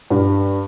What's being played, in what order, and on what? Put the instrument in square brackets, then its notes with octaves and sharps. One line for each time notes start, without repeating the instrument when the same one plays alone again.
[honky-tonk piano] G2